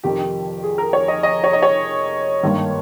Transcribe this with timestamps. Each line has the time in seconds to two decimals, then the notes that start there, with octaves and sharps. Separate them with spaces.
0.03 F1 F2 D#3 G4
0.64 G#4
0.78 A#4
0.93 C#5
1.08 D#5
1.23 D#5
1.44 C#5
1.53 D#5
1.63 C#5
2.43 G#1 G2 D#3 A#3